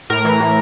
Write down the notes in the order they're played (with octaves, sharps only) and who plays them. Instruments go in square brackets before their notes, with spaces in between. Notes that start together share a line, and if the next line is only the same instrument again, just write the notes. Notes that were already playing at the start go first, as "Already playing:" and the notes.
[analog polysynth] A2 A#4
E3
A2